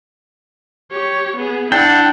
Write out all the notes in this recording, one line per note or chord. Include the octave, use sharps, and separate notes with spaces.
G4 C#5
B3 G#4
D4 E4 F#5 G5